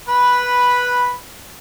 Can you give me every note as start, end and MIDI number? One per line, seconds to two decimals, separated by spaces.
0.08 1.14 71
0.08 1.14 83